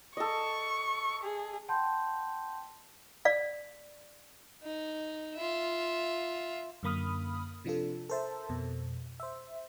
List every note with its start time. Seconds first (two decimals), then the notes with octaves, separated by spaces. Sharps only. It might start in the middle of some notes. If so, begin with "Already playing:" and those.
0.17 A4 D#5 C#6
1.23 G#4
1.68 F#5 G5 A5 B5 C6 G6
3.25 D5 F5
4.64 D#4
5.36 F4 E5
6.83 F#2 D3 A#3 B5 D#6 F6
7.65 C3 F3 D4 F4 A4
8.09 A4 A#4 C5 E5 A5
8.49 F2 B2
9.20 C5 E5